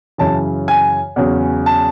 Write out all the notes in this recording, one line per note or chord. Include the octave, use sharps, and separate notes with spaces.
F#2 C#3 E3 A5
G#5
E2 C#3 F#3 C#4
A5